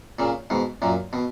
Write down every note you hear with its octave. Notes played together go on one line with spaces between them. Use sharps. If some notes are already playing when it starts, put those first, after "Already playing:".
A#2 C#3
G#2 B2
F#2 A#2
B2